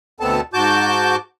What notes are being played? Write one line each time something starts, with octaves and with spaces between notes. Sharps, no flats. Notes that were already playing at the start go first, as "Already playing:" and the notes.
D2 B2 B3 C4 A4 A5
G#2 F#4 A5 D6 G6